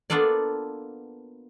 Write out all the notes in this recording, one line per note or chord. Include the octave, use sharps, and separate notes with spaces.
A#3 B3 D4 F4 A4 D5